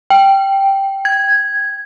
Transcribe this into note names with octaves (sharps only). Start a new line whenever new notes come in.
G5
G#6